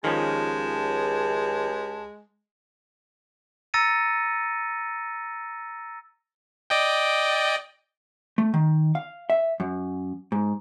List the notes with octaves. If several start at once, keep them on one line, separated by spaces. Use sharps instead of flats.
C#2 D#3 F3 G#3 C#4 G4 A5
A#5 E6 A6 A#6 C#7 D#7
D5 D#5 G5
A3
D#3
F5
E5
F#2
G#2